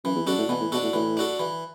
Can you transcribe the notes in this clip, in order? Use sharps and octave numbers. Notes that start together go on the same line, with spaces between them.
F#2 E3
E2
F#2 D4 F#4 A4
A2
B2 E3
A2
B2 D4 F#4 A4
A2
A2 E3
D4 F#4 A4
E3